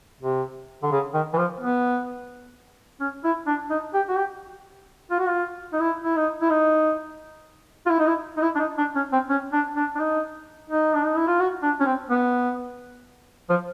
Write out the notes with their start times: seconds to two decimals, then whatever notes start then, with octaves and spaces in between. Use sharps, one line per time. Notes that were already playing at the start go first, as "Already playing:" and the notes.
0.21 C3
0.83 D3
0.92 C#3
1.14 D#3
1.33 E3
1.37 F3
1.60 B3
3.00 C#4
3.24 E4
3.47 D4
3.70 D#4
3.94 G4
4.09 F#4
4.17 G4
5.11 F4
5.19 F#4
5.28 F4
5.73 D#4
5.80 E4
6.04 E4
6.16 D#4
6.42 E4
6.50 D#4
7.86 F4
7.90 E4
7.99 D#4
8.07 E4
8.37 D#4
8.42 E4
8.55 D4
8.60 D#4
8.78 D4
8.95 C#4
9.13 C4
9.29 C#4
9.53 D4
9.76 D4
9.95 D4
9.99 D#4
10.70 D#4
10.94 D4
11.04 D#4
11.16 E4
11.27 F4
11.40 F#4
11.63 D4
11.80 C#4
11.86 C4
12.10 B3
13.49 F3